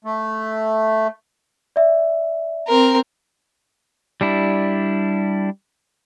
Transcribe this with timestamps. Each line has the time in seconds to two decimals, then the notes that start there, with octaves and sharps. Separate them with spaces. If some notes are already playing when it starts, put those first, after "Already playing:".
0.05 A3
1.76 D5 E5
2.68 C4 A#4
4.21 G3 D4 E4